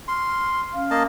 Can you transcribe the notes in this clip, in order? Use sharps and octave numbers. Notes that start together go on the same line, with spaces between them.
C6 C#6 F6
C#4 F5 F6
A#3 D#5 A5